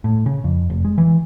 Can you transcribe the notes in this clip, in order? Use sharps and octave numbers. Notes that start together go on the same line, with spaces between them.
A2
C#3
F2
F1
G#3
E3